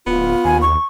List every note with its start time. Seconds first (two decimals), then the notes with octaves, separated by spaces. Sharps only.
0.07 D1 B3 F4
0.45 D#2 G#5
0.62 C#6